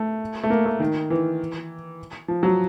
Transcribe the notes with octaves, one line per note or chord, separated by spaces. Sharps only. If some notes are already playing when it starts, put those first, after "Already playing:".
Already playing: A3
A3
A#3
A3
D#3
E3
F3
F#3